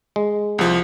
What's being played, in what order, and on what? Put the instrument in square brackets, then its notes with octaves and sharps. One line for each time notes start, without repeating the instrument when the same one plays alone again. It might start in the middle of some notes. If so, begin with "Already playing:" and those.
[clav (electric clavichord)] G#3
[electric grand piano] C2 F3